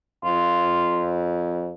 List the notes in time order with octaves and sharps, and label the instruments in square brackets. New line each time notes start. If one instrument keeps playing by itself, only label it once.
[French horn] F2 [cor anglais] F4